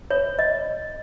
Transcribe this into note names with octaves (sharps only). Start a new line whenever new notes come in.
C#5
D#5